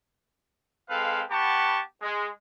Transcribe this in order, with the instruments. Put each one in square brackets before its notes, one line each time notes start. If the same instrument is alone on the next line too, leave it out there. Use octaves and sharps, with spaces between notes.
[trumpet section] G#3 C4 A4 B4 F5
B3 G4 F#5 A5 B5 C#6
G#3